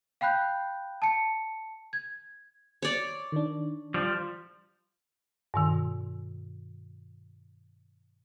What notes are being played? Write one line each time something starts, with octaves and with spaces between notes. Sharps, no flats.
F5 G5 B5 F#6 G6
A5 C#7
G#6
C#5 D5
D#3 D4
F3 G3
G2 B2 D#3